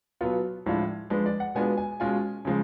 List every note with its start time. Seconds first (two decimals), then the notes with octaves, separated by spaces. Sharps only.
0.21 B2 F#3 B3 F4
0.66 A2 F3 G#3 D4 F4
1.10 F3 G#3 D4 B4
1.26 D5
1.40 F#5
1.55 B2 G#3 B3 D4 F4 G#5
1.78 G#5
2.00 B2 G#3 C#4 F4 G#5
2.45 C#3 F3 G#3